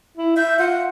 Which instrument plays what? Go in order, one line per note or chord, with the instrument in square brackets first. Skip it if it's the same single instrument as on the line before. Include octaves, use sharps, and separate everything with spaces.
[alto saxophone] E4
[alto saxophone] E5 [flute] G6
[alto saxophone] F4 [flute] F#5